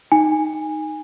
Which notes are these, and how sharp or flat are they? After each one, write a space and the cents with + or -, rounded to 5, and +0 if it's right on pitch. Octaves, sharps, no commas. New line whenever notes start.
D#4 +0 G#5 -15